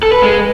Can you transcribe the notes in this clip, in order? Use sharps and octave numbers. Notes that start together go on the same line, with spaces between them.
A4
B4
G#3